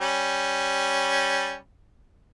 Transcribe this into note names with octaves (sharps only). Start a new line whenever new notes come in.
G3 C#4